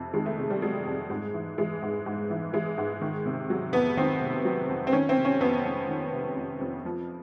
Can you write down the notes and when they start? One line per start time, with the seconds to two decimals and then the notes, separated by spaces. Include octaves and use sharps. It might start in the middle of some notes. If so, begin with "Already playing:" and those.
Already playing: F2 C3
0.14 D#3 G#3
0.26 A3
0.38 C3
0.50 G3
0.62 F#3 G#3
0.86 F2
1.10 G#2
1.34 E3
1.58 E3 G#3
1.82 G#2
2.06 G#2
2.30 E3
2.53 E3 G#3
2.78 G#2
3.01 D#3
3.25 C3
3.50 F#3
3.73 F2 B3
3.97 D#3 C4
4.21 C3
4.45 F#3
4.69 F2
4.87 C4
4.92 D#3 C#4
5.09 C4
5.17 C3
5.25 C#4
5.40 F2 B3
5.65 F2
5.89 D#3
6.13 C3
6.36 F2
6.61 F2
6.85 F3